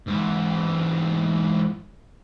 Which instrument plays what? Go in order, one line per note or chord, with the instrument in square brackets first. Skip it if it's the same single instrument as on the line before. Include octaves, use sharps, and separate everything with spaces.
[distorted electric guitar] G#2 E3